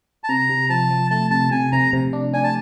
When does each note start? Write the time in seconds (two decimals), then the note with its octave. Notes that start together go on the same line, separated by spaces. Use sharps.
0.24 A5
0.28 C3 A#5
0.49 C3
0.70 F3 A5
0.90 F3
1.11 A3 A5
1.31 C3 A5
1.51 C3 G#5
1.72 C3 A#5
1.93 C3
2.13 D4
2.33 D4 G#5
2.44 A5